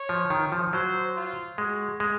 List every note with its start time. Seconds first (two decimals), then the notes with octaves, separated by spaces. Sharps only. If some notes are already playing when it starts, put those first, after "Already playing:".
Already playing: C#5
0.09 F3
0.30 D#3
0.52 F3
0.73 F#3 C5
1.16 F4
1.58 G#3 F#4
2.00 G#3